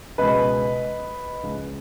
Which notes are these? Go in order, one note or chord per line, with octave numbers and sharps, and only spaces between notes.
C#2 B2 G#3 B4 D#5
C#2 C#3 G#3